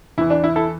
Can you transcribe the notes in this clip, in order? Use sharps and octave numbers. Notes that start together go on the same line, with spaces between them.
E2 E3 E4
D4
E4
E4 A4